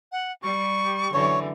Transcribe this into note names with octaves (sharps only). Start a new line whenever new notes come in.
F#5
G3 G4 C#6
F#2 D3 E3 C#5